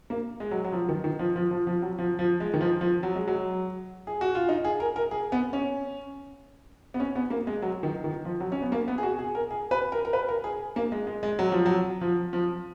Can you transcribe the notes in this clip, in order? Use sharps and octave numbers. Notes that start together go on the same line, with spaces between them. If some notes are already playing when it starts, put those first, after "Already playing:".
A#3
G#3
F#3
F#3
F3
D#3
D#3
F3
F3
F3
F3
F#3
F3
F3
G#3
D#3
F3
F3
F#3
G#3
F#3
G#4
F#4
F4
D#4
G#4
A#4
A#4
G#4
B3
C#4
B3
C#4
B3
A#3
G#3
F#3
D#3
D#3
F3
F#3
C#4
B3
A#3
B3
G#4
F#4
G#4
A#4
G#4
B4
A#4
A#4
B4
A#4
G#4
A#3
G#3
G#3
G#3
F#3
F3
F#3
F3
F3